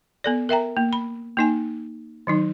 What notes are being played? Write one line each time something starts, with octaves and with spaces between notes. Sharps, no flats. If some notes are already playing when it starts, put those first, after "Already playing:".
B3 A4 D5
A#4 E5 G5 A#5
A#3
B5
A#3 D#4 G#5
D#3 F#3 D#4